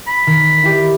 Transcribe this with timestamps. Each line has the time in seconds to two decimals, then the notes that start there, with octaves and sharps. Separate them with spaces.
0.07 B5
0.27 D#3
0.63 E4 G4 D5